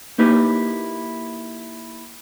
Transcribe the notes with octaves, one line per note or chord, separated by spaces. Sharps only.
A#3 D#4 E4 G4 B4